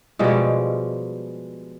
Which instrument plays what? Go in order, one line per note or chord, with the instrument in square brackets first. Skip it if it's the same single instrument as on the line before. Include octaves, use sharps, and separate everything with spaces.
[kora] B2 F3 G3 G#3